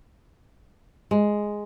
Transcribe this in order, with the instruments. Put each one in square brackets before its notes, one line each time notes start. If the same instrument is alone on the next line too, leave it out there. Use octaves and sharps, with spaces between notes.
[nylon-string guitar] G#3